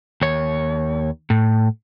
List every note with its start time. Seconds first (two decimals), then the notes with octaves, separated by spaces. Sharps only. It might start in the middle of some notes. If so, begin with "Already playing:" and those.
0.21 D#2 C#5
1.30 A2